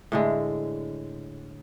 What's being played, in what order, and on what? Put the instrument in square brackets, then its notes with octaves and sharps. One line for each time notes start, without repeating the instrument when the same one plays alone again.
[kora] A2 D3 G#3